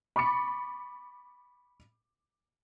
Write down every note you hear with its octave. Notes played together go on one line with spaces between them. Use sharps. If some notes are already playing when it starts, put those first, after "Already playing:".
B5 C#6 D6 A6 C#7